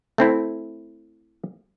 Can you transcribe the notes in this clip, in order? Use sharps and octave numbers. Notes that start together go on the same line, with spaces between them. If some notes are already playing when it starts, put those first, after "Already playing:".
A3 C4 E4